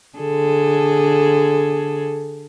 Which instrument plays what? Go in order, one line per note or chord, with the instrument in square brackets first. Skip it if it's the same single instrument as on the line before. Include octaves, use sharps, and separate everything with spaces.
[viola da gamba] D3 G#4 A4